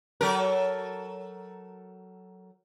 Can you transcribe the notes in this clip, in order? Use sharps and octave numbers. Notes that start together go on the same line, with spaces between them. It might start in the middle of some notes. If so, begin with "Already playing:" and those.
F#3 A4 A#4